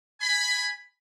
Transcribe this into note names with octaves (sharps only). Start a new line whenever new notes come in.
G#5 B5